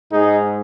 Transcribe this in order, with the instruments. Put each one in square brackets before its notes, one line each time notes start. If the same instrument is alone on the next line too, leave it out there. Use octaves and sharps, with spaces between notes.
[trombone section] G#2 G#3 D#4 G#4